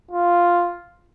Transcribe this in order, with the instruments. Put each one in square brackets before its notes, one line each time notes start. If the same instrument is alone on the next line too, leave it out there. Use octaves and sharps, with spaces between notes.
[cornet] F4